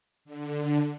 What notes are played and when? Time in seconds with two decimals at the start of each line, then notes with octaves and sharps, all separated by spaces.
0.25 D3